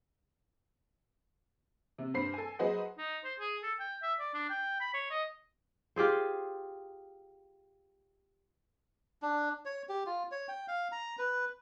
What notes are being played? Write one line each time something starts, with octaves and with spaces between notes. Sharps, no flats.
C3
G2 C5 B5 C7
A4 G#5
F#3 G#4 B4 C5 D#5 F#5
D#4
C5
G#4
A4
G5
E5
D5
D4
G5
B5
C#5
D#5
F4 G4 G#4 C5
D4
C#5
G4
F4
C#5
G5
F5
A#5
B4